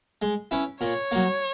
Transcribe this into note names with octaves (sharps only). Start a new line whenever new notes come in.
G#3
C#4 E4 B4
A#2 C#5
F#3 A#3